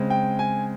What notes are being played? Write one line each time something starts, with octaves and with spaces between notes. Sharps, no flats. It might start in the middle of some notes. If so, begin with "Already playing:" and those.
Already playing: C#3 G#3 C4
G5
G#5